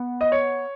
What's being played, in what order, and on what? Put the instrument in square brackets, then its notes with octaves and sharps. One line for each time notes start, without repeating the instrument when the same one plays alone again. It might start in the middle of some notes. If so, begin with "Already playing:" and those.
Already playing: [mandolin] B3
[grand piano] D#5
C#5